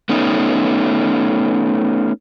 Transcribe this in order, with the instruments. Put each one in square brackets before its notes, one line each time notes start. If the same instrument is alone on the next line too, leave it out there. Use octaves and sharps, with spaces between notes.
[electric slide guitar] A3 B3 C#4 D#4